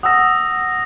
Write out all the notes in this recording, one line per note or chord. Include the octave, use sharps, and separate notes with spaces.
F#5 D#6 E6 A#6